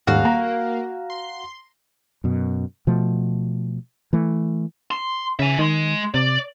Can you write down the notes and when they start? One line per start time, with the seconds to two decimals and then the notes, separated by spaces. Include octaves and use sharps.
0.07 D#1 G#2 F#4 F5
0.25 A#3 A#5
1.10 C6
2.24 F#2 B2
2.87 B2 F3 A3
4.13 E3 A3
4.91 C6
5.39 C#3 E5 G#5
5.59 D#3 G#3 C6
6.14 C3 D5